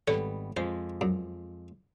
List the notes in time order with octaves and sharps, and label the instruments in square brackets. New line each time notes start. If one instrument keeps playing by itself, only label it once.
[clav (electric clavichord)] G#1 G3 B3 [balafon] A4 [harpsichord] C#5
[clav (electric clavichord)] F2 F3 G#3 [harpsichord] C5
[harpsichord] F#2